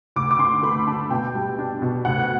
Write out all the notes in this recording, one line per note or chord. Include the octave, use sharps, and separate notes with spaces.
D2 D6
D6
D3 C6
A3 B5
D4 A5
B2 G5
G3
D4
B2
D2 F#5